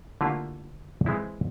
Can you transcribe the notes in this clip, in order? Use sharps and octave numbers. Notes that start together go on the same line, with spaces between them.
D3 A3 A#3 E4 F4 G4
E3 G#3 C4 E4